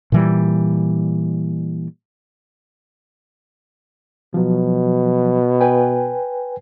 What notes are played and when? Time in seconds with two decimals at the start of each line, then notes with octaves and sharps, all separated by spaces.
0.12 A#2 E3 G3
4.34 B2 F3 F#3
5.61 B4 G5 G#5